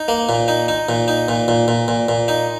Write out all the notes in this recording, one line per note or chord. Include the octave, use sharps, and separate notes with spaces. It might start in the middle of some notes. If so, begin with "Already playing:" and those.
Already playing: D#4
A#3
A#2
D#4
D#4
A#2
D#4
A#2
A#2
A#2
A#2
A#2
D#4